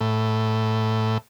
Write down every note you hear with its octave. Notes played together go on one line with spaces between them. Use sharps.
A2